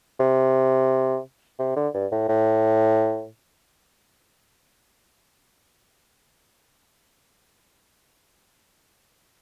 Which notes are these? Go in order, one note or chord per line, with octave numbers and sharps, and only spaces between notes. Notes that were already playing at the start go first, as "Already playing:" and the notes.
C3
C3
D3
G2
A2
A2